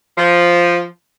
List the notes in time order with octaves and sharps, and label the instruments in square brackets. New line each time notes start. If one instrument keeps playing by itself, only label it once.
[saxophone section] F3